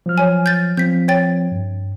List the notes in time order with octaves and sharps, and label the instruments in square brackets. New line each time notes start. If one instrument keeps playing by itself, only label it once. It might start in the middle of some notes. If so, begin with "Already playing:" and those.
[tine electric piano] F3 F#3 F6
[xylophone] C#5 G#5
G6 A6
[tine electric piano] F3 C4 [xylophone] G6 B6
[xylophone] C#5 G5 A6
[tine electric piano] G2